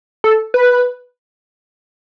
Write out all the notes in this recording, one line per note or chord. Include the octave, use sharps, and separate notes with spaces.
A4
B4